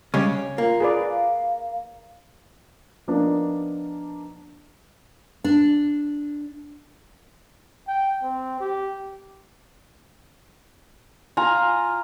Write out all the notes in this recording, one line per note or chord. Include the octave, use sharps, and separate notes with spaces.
C#3 G3 G#3 C#4 C#6 D6
A#3 F4
G#4 B4 D5
F5
F3 A#3 B3 D4 D#4
D4
G5
C4
G4
F4 G#5 A#5